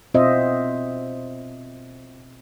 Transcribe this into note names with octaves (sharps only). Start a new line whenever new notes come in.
B2 C4 F4 C5 D#5 E5